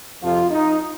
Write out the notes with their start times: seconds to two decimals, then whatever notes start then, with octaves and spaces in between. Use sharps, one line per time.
0.21 F2 C3 F3 F4
0.50 D#4